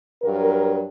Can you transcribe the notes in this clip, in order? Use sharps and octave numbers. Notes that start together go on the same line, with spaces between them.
G2 F#3 A#4